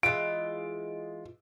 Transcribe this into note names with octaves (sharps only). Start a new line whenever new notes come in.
E3 G#3 F4 D7